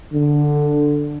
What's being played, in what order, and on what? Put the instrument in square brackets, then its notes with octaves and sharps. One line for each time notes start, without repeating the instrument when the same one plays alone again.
[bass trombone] D3